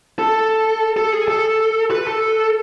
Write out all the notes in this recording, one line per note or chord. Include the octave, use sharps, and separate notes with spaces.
A4
A4
G#4
A4
B4
A4